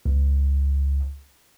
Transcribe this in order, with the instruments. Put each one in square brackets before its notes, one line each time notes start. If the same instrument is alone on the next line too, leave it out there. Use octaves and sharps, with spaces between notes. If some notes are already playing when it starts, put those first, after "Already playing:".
[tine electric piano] C#2